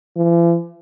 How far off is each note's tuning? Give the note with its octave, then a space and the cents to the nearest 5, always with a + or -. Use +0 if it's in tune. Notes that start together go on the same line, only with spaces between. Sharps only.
E3 +45